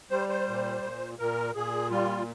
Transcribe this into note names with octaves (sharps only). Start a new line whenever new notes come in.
G3 C5
C5
A#2
A#2
A#2 A#4
A#2 G#4
G3 F4